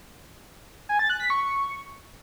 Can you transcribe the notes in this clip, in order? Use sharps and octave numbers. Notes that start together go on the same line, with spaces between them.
G#5
A6
F#6
B6
C#6